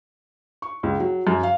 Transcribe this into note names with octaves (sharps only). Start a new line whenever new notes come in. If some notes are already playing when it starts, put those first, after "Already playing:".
C#6
C#2
F#3
F#2
F5